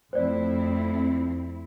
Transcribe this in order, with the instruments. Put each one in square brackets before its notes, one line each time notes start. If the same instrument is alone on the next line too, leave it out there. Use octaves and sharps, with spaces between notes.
[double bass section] F2 [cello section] A3 C4 E4 [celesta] C5 D5